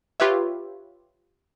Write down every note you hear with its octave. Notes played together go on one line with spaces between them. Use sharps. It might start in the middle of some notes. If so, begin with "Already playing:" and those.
F4 G4 B4 C#5 E5